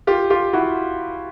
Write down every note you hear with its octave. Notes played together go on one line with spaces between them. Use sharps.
F4 G4
F4 G4
E4 F#4